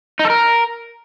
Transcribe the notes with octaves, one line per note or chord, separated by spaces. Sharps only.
D#4
A4
A#4